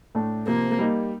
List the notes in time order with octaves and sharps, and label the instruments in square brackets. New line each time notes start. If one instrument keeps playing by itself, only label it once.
[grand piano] A2 A3 D4
[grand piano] C3 F3 C4 [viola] A#3
[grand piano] G3 A#3 D#4